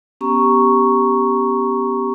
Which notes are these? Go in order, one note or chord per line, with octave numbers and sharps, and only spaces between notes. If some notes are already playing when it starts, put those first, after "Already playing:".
B3 C#4 G4 A#5 C#6